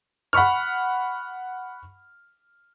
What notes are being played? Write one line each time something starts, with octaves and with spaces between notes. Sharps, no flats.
F#5 B5 C#6 F6